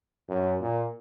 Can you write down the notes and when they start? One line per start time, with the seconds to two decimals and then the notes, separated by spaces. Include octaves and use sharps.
0.29 F#2
0.61 A#2